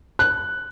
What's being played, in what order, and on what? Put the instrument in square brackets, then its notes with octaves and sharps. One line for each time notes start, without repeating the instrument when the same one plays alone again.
[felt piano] F#6